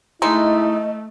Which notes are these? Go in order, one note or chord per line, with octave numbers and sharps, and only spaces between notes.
G#3 A3 D#4 E4 D#5